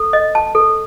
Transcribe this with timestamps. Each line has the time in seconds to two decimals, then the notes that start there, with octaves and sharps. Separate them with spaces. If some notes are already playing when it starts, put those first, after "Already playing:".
Already playing: A4
0.13 D#5
0.35 A5
0.55 A4